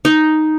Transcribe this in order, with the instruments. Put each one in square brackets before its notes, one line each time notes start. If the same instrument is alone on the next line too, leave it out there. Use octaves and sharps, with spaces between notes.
[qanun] D#4